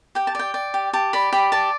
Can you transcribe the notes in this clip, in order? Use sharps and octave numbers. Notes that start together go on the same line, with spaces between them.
G4 G5
A5
D5 G5
D5
G4
G4 A5
D5 B5
G4 B5
D5 A5